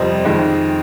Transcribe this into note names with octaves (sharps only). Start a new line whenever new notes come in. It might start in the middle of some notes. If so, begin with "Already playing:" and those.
Already playing: F2 C3 G3 C5 D#5
F2 D#3 G#3